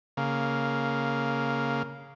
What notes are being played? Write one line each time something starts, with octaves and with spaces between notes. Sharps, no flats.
C#3 A#3